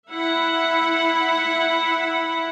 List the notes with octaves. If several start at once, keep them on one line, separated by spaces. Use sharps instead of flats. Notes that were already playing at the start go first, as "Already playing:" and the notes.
E4 E5 F#5